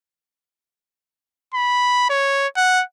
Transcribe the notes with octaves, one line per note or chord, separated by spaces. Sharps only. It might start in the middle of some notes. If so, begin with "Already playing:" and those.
B5
C#5
F#5